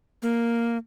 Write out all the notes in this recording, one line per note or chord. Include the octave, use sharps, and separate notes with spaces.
A#3